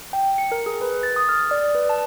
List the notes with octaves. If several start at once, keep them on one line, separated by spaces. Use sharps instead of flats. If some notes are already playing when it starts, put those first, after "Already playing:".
G5
C#7
A#4
G#4
B4
A6
D#6
F6
D5
B4
A5